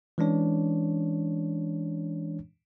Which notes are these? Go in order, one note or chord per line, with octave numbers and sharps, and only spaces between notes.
E3 G#3 C#4 D4 C#5